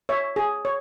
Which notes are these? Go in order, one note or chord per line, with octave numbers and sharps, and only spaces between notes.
C#5 E5
G#4
C#5